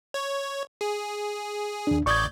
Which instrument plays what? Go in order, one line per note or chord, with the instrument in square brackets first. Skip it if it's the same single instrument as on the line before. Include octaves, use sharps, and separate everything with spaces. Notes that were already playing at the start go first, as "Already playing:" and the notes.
[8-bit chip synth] C#5
G#4
[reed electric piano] D#2 D4
[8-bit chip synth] A1 D5 G6 [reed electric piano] C#6 D#6 G#6